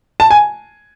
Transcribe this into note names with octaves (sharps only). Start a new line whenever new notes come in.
A5
G#5